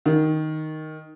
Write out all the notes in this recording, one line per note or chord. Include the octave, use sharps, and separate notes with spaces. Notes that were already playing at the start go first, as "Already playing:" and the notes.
D#3